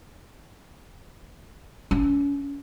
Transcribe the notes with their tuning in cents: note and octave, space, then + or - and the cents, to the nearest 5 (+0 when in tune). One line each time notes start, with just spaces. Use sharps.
C#4 +35